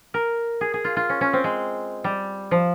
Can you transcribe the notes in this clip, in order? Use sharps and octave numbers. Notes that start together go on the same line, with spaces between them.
A#4
G#4
G#4
F4
F4
C#4
C#4
C4
G#3
G3
F3